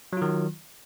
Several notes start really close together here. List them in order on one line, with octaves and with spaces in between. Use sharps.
F#3 F4 D#3